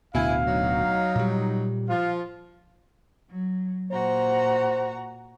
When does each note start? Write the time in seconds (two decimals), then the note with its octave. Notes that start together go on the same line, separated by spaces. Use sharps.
0.15 D1 D2 B2 E4 F5 G#5
0.47 F#3 D#4
1.16 A#2 G3
1.89 F3 F4 F5
3.31 F#3
3.91 A#2 F#4 C5 A#5